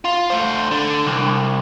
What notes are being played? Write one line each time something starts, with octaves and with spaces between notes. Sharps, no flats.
F4
A3 C5
D3
C2